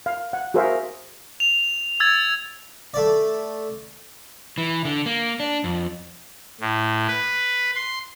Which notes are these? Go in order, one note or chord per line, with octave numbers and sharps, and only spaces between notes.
F5
F#5
F#4 G#4 A#4 C5 E5 F5
F7
E6 G#6 A6
A3 D5
E3
D3
A#3
D4
F2
A2
B4
C6